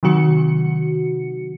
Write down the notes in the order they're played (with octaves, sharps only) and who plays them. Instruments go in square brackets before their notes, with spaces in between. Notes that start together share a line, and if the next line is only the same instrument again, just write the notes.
[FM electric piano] C3 D#3 F#3 F#4 C#7